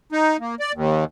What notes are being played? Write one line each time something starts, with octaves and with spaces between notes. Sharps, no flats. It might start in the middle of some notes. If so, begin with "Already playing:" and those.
D#4
A#3
D5
D#2